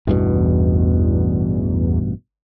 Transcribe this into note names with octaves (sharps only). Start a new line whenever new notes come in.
A1 E2 G2 B2